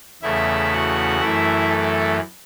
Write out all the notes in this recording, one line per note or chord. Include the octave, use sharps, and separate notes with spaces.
E2 C#3 A3 E4 E5
F#4 F#5
F#2 E3 A3 E4 E5
A4